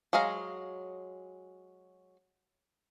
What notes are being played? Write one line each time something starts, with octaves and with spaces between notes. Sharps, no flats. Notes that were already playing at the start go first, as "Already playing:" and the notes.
F#3 G#3 G#4 F5 A#5